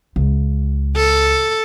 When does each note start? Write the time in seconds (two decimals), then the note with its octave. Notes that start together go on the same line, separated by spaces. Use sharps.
0.16 C#2
0.96 A4